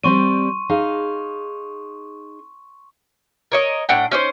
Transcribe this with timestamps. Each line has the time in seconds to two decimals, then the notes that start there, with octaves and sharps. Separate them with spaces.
0.04 G3 C4 D5 C6 C#6 D#7
0.69 D#4 G#4 F5
3.52 A#4 C#5 D#5
3.89 A2 D4 F#5 G5
4.12 C#4 D#4 C5